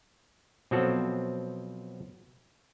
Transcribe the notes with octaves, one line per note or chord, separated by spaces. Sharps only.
B2 F3 F#3 C4 F#4 A4